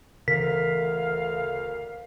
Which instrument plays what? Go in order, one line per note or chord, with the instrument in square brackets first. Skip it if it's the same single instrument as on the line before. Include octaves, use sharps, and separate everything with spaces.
[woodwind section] D2 F5 [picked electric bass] C#3 E3 [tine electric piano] A#4 [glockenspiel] B6